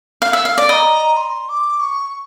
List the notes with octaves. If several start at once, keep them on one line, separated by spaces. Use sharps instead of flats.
F5
E5
F5
D5
D#5 A#5 B5
C6
D6
C#6